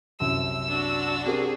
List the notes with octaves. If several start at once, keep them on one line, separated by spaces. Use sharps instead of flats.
C2 F#2 E6
D4 F#4
C4 G4 G#4 A#4